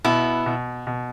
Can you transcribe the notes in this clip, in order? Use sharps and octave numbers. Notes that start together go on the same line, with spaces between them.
B2 B3 E4
B2
B2